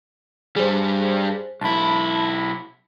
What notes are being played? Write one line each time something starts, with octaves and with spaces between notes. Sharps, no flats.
G2 G3 G#4 C5
B1 E4 A5 B5